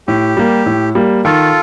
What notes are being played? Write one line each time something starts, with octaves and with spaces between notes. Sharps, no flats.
A2 G4
G3 A#3
A2
G3 A#3
D#3 F4 A4